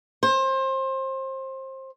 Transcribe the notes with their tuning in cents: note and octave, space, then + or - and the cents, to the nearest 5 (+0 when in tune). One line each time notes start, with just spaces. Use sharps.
C5 +25